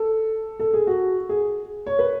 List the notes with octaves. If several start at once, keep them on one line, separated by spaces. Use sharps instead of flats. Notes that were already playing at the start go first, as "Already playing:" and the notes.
Already playing: A4
A4
G#4
F#4
G#4
C#5
B4